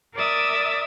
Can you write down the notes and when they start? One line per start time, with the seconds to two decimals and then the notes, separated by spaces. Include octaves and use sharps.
0.15 A#4 D5 E5 D#6 E6 A6